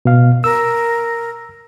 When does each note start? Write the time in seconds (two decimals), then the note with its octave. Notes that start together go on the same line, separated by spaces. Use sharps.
0.05 B2 F5
0.44 A#4 E6